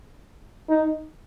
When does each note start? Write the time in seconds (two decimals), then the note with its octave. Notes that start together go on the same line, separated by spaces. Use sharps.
0.69 D#4